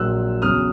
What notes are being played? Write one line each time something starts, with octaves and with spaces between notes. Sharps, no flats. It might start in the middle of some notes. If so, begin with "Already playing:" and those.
Already playing: A#1 A#2 F#3 E6 F#6
E2 C#3 F#3 D#6 F6